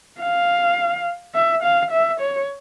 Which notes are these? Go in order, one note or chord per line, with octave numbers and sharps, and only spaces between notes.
F5
E5
F5
E5
C#5